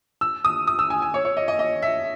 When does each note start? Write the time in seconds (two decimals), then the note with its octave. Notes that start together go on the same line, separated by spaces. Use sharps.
0.21 E6
0.45 D#6
0.67 D#6
0.79 E6
0.90 G#5
1.02 G#5
1.14 C#5
1.25 C#5
1.37 D#5
1.48 D#5
1.59 D#5
1.82 E5